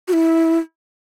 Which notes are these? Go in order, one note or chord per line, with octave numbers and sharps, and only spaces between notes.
F#4
E4